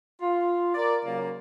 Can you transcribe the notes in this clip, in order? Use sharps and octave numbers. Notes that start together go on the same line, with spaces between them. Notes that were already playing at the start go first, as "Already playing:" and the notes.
F4
A#4 D5
C#3 F#3 A#3